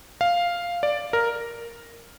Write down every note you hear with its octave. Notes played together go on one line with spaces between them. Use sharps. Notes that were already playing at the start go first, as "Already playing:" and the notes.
F5
D5
A#4